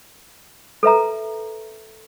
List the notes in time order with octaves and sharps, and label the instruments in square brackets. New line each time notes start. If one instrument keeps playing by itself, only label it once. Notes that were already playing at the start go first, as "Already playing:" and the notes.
[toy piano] A4 B4 E5 A#5